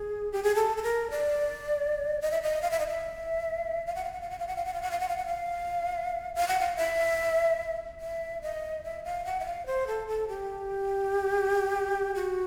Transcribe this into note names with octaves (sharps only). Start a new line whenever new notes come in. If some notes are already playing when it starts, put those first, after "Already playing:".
Already playing: G#4
G4
G#4
A4
A4
A#4
D5
D#5
E5
D#5
F5
E5
D#5
E5
F5
F#5
F5
F#5
F5
F#5
F5
F#5
F5
F#5
F5
F#5
F5
F#5
F5
F#5
F5
F5
F#5
F5
E5
E5
D#5
E5
F5
F#5
E5
F5
C5
A4
A4
G4
F#4